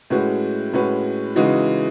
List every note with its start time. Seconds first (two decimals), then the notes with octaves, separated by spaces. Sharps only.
0.10 A2 G#3 C#4 F#4 B4
0.73 A2 G#3 C#4 F#4 B4
1.36 C#3 E3 G#3 D#4 F#4